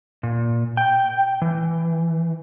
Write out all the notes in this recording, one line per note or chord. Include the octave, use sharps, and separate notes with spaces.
A#2
G5
E3